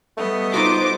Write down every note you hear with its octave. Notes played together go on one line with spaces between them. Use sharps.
G3 A3 B3 D#5
D#4 F4 F#4 C5 D6